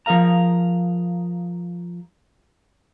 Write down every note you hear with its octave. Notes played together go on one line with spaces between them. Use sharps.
F3 G#4 A#4 F5 A#5